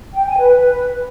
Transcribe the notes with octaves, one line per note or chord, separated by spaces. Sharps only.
G5
G#5
B4